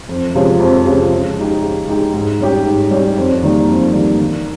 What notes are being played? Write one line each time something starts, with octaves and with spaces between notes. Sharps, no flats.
F2
C3 F3 G#3 C#4
F2
C3 F3 G#3 C#4
C#3
G#3 D#4 G4
C#3
G#3 D#4 G4
G#2
G3 C#4 G4
G#2
G3 C#4 G4
F2
D#3 G3 A#3
F2
D#3 G3 A#3
D#3